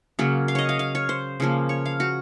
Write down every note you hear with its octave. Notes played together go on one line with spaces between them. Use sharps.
C#3 F#3 A#3
F5
C#5 D#5
F5
F5
C#5
C5
C#3 F3 A#3
C#5
F5
F#4